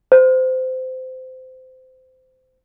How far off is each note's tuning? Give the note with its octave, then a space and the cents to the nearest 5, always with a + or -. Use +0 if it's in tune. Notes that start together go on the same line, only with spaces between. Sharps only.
C5 -20